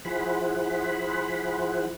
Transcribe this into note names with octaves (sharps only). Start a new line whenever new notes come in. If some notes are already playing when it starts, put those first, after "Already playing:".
F3 E4 G#4 C5 F#5 B5